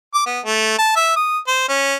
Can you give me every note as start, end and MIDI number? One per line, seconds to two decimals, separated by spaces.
0.14 0.24 86
0.26 0.40 59
0.45 0.78 57
0.78 0.92 81
0.96 1.12 76
1.16 1.38 87
1.47 1.64 72
1.69 1.96 61